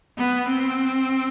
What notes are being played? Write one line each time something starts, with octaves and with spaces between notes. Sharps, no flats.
B3
C4